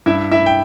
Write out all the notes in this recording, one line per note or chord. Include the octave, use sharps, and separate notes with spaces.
G2 E4 E5
E4 E5
G5